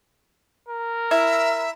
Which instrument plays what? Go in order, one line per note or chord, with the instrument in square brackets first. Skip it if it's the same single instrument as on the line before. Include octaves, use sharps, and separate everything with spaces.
[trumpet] A#4
[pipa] E4 [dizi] E5